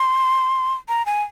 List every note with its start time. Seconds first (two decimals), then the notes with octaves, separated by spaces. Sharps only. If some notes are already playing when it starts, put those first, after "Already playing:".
Already playing: C6
0.89 A#5
1.06 G#5